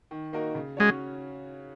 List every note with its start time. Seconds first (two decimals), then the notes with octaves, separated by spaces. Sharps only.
0.11 D#3
0.33 A#3 D#4 F#4 A#4
0.55 C#3
0.77 G#3 C#4 F#4 C#5